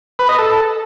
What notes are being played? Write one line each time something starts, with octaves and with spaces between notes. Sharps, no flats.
B4
D#5
A4